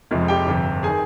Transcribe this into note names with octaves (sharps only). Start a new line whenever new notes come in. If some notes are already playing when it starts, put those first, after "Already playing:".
F1 F2 C3 F3 G#3
G4 G5
G1 F2 C3
D#3 G#4 G#5